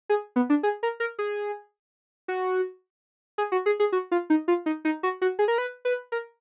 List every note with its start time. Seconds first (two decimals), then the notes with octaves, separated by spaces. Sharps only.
0.09 G#4
0.36 B3
0.50 D4
0.63 G#4
0.83 A#4
1.00 A#4
1.19 G#4
2.28 F#4
3.38 G#4
3.52 F#4
3.66 G#4
3.80 G#4
3.92 F#4
4.11 F4
4.30 D#4
4.48 F4
4.66 D#4
4.85 D#4
5.03 F#4
5.22 F#4
5.39 G#4
5.48 A#4
5.58 B4
5.85 B4
6.12 A#4